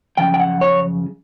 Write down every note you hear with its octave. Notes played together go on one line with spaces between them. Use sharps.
F#2 C#3 F3 G5
G5
F#5
C#5